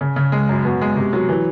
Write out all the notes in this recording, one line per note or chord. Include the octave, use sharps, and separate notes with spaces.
C#3
C#3
G#3
F#2
B2
G#3
C3
F#3
E3